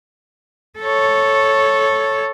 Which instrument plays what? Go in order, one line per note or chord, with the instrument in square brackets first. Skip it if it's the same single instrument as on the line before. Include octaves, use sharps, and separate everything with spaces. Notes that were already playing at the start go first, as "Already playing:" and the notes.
[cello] A4 C#5